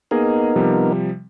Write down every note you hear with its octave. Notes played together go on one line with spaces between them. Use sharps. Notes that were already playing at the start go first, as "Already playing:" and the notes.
A#3 B3 D#4 G#4 A#4 D#5
C3 F3 G3